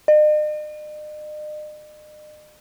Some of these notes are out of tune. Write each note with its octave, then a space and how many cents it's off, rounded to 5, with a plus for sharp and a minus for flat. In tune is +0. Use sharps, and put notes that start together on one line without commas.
D#5 -45